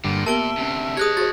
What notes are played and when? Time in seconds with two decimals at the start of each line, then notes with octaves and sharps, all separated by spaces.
0.04 G2 A#2 D3
0.26 B3 G4 A#4 E5 A5 D7 G7
0.57 D2 C3 C#4
0.97 G4 G#4 C#5 D#5 D#6 F#6 G#6
1.17 F#4 G#4 C5 A6